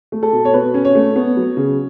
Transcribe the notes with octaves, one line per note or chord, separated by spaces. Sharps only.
A3
A4
B2
C#5
B2 B4
C#4
C#5
A3
B3
F#3
C#3